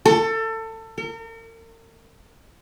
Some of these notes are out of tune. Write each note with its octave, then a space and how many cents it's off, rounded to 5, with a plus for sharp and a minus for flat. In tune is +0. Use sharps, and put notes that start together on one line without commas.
A4 +25
A#4 -40